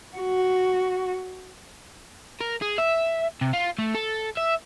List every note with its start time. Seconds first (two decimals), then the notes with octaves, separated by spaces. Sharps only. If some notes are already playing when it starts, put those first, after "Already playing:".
0.17 F#4
2.41 A#4
2.62 G#4
2.78 E5
3.41 C3
3.53 F4
3.78 A3
3.95 A4
4.37 E5